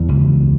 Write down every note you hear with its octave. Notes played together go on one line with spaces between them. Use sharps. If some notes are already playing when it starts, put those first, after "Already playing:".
Already playing: E2 E3
C#2